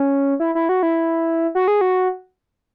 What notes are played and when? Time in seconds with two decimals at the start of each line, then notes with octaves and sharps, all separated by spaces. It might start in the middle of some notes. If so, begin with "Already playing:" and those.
Already playing: C#4
0.40 E4
0.55 E4
0.69 F#4
0.83 E4
1.55 F#4
1.68 G#4
1.81 F#4